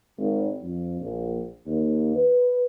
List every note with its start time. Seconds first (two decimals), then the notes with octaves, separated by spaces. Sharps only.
0.18 G#1
0.62 F2
1.00 A#1
1.66 D#2
2.16 B4